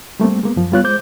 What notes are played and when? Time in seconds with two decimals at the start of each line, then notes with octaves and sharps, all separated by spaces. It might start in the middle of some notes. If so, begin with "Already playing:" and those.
0.20 G3 A3 A#3 C4
0.43 G#3 A#3 B3
0.56 F#2 F3
0.72 G3 B3 F4 C#5 F#6
0.84 G#3 C5 D6 G6